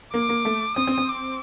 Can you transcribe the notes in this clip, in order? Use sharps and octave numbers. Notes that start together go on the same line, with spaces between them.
A#3 D6
A#3
A3
C4 D#6
C4
C4
D6